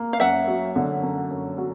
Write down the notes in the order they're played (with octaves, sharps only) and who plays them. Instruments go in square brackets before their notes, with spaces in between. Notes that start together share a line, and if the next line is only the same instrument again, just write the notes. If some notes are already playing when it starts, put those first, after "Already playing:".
Already playing: [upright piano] A#3
[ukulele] F5
[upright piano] F#2 [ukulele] E5 F#5
[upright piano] F#3
D3
F#2
F#2
F#3